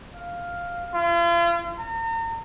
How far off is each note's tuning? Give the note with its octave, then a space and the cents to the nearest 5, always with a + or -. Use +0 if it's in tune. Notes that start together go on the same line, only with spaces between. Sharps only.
F5 +0
F4 -40
A#5 -40